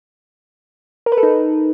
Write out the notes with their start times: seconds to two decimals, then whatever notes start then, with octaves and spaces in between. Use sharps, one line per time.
1.06 A#4
1.12 B4
1.17 A4
1.23 D#4